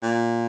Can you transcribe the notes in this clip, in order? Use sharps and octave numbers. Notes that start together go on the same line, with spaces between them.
A#2